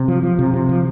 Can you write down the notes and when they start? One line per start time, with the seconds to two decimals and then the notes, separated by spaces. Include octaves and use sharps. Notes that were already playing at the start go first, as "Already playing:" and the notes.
Already playing: C3
0.08 F3
0.23 F3
0.39 C3
0.54 C3
0.69 F3